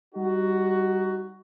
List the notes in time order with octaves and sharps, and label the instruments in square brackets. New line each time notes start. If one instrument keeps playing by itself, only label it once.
[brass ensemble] G3 D#4 F#4